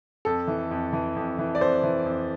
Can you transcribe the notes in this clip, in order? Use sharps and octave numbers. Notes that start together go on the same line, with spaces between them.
F2 A4
E3
F2
E3
F2
E3
D5
F2 C5
E3
F2